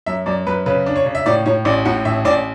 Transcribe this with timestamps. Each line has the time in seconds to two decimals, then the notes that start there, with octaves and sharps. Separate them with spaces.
0.06 F#2 E5
0.26 F#2 D5
0.47 F#2 B4
0.66 C#3 B4
0.86 D4
0.96 C#5
1.06 C#3
1.15 E5
1.26 A2 D5
1.46 A2 C#5
1.65 A1 D5
1.85 A2 F#5
2.05 A1 E5
2.25 A1 D5